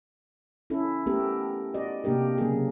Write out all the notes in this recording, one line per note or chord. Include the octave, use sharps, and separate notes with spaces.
C#4 E4 A4
A3 B3 C#4 G4 A4 A#4
F#4 D5 D#5
C3 A#3 D4 G4 A#4
C#3 F#3 A#3 G4 G#4